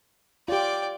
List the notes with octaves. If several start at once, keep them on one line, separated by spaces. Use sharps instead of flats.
F4 G4 D5 G5